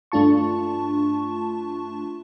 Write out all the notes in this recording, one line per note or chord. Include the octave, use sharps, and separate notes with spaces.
G2 A3 D4 F4 A5 C#6